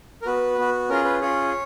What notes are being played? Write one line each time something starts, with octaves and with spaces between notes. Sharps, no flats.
A#4
B3 F#4 B4
B3 F#4
C#4 F4 G#4 A#4
B4
C#4 F4 G#4 C#5